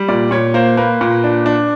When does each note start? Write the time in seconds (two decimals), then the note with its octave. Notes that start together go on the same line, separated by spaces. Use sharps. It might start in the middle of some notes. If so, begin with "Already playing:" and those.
Already playing: G3
0.08 A#2 D5
0.31 A#2 C#5
0.54 A#3 C5
0.77 A#3 B4
1.01 A#2
1.24 D4
1.46 D4